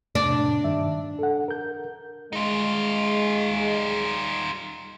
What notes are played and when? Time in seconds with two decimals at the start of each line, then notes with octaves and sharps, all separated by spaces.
0.15 F2 A2 C3 D4
0.64 G2 D#3 E5
1.19 A4 F#5
1.48 A#4 G6
2.33 G#3 D#4 F4